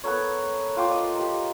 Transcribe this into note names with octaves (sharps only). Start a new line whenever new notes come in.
B3 A4 A#4 C#5
F4 G5 D6
D#5
G4 A#4